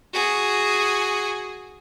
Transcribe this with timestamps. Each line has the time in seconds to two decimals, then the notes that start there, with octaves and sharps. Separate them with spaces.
0.14 F#4 G#4